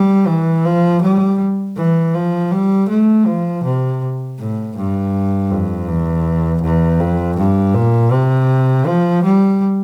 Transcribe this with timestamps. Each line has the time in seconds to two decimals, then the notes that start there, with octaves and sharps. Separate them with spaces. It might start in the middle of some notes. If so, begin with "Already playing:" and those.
Already playing: G3
0.27 E3
0.65 F3
1.01 G3
1.76 E3
2.14 F3
2.51 G3
2.89 A3
3.26 F3
3.64 C3
4.39 A2
4.76 G2
5.51 F2
5.88 E2
6.62 E2
7.00 F2
7.37 G2
7.74 A#2
8.12 C3
8.86 F3
9.23 G3